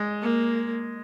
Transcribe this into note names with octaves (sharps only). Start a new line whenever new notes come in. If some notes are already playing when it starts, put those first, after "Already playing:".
Already playing: G#3
A#3